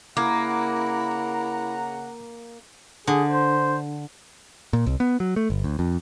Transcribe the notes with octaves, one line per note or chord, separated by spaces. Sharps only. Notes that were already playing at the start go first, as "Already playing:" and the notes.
C#3 A#3 E4 F#5 A#5 D6 G#6
D3 G#4
C5
A#2
C2
B3
F#3
A3
G1
D2
F2